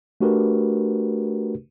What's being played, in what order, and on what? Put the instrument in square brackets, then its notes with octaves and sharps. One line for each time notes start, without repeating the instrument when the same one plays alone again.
[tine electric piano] A3 D4 F#4 G4 A#4 B4